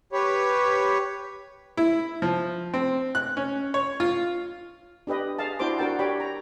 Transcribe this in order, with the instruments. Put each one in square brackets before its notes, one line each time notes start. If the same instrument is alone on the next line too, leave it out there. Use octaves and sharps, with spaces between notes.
[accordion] G4 B4 C#5
[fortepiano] E4
F3
C4
F#6
C#4
C#5
F4
[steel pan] D4 G4 B4 D#5
G#4 D#5 F5 A5
D4 E4 F#4 C5 C6 D6
D4 F#4 A#4 G5 A5
G4 C#5 D5 G5 B5
A#5